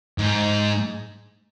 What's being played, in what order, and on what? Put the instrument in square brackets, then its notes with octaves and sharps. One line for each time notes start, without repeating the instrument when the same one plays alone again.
[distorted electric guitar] G#2